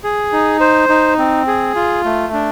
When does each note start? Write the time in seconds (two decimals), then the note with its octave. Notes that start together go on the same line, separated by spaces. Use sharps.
0.03 G#4
0.32 D#4
0.60 C5
0.89 D#4
1.19 C4
1.47 G#4
1.75 F4
2.04 A3
2.33 D4